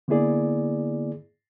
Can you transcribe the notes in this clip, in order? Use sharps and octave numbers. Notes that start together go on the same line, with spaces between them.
D3 A#3 B3 E4 G#4 D5